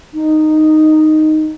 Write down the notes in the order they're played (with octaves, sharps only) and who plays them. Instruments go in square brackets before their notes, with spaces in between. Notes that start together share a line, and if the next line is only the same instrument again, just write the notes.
[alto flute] D#4